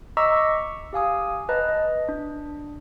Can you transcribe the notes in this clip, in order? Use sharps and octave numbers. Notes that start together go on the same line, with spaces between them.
D#5 A#5 C#6 D6 E6 B6
C#6
G4 F5 G#5 D#6
B4 D#5 A5 A#5
D#5
D4